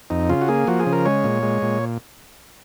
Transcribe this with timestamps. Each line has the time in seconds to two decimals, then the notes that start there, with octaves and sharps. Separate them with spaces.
0.10 F2 D#4
0.29 C#3 F4
0.42 F#4
0.48 A#3 G#4
0.67 F3 F#4
0.80 G#4
0.86 C#3
0.93 A#4
1.05 G#3 C#5
1.24 A#2
1.43 G#3
1.62 A#2